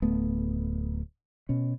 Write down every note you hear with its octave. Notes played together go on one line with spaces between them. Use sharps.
D1 A3 B3
B2 C#4